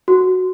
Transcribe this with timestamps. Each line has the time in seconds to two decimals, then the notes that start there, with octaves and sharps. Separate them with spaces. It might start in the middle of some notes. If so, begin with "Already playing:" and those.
0.08 F#4